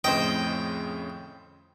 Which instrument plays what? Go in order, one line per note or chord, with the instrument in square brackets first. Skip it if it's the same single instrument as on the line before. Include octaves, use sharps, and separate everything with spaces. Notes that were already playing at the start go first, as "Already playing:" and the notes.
[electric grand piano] F2 A2 C#3 [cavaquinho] C5 D#5 [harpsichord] G5